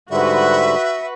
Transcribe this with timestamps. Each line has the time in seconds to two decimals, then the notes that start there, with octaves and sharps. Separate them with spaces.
0.11 G#2 D3 G3 F#4 B4 E5